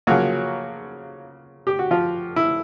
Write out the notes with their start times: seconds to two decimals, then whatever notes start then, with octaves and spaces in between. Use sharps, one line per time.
0.07 C#3 F3 F#3 A#3 F#4
1.67 G4
1.79 F#4
1.91 F3 F4
2.36 E4